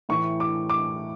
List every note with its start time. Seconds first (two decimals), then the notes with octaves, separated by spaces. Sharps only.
0.09 A2 E3 A3 C#6
0.40 D6
0.70 D6